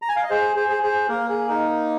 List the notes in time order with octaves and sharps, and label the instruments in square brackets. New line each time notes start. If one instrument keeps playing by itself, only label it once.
[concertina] A#5
G#5
F5
D#5
G#4 C5
G#4 C5
G#4
G#4 C5
A#3 A#4
G#4
D#4 A#4